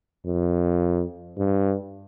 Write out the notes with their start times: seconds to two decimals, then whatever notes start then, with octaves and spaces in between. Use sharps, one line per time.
0.26 F2
1.37 G2